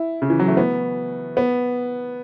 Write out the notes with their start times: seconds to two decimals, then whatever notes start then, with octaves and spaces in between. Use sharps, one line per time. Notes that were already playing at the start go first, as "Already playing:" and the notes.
Already playing: E4
0.22 C#3
0.30 E3
0.40 F#3
0.48 A3
0.57 B3
1.37 B3